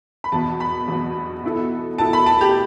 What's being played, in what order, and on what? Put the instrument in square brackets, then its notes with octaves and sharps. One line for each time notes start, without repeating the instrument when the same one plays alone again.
[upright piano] B5
[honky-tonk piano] E2 B2 B3 [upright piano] A5
[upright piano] B5
[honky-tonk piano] E2 B2 B3
B2 B3 E4 A4
[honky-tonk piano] B2 B3 E4 A4 [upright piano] A5
[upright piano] B5
A5
G4